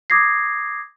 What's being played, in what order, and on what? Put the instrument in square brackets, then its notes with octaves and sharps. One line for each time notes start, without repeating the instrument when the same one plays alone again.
[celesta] D6 D#6 G#6 A#6 C7